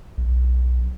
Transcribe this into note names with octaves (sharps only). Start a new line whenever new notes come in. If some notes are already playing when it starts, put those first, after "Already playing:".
B1